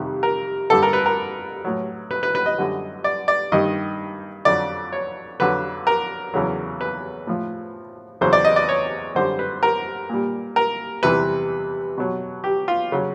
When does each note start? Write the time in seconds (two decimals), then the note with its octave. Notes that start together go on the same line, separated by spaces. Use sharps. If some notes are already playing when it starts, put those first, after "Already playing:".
Already playing: F2 C3 D#3 G3
0.23 A#4
0.70 G2 D3 G3 A4
0.83 A#4
0.93 B4
1.06 A#4
1.65 A2 F#3
2.11 B4
2.23 B4
2.35 B4
2.46 D#5
2.58 F#2 D3 G3
3.04 D5
3.28 D5
3.52 G2 D#3 G3 D#5
4.45 F2 D3 F#3 D5
4.92 C#5
5.40 F2 D3 F#3 B4
5.87 A#4
6.34 E2 C#3 F#3
6.81 B4
7.27 A2 F3
8.21 E2 C#3 F#3 C5
8.33 D5
8.45 D#5
8.56 D5
8.69 C#5
9.15 F#2 D3 G3 C5
9.39 B4
9.63 A#4
10.09 A#2 G3
10.56 A#4
11.03 E2 C3 E3 G3 B4
11.98 B2 F#3
12.44 G4
12.68 F4
12.92 C#3 F#3